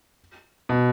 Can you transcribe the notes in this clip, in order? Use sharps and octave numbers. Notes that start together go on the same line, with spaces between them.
B2